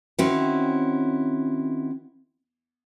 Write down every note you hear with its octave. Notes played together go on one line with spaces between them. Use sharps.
D#3 C4 C#4 E4 F#4